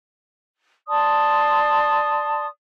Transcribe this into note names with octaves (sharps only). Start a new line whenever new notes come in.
D5 A5 C6 D#6